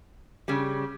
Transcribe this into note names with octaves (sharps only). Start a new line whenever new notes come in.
C#3 G3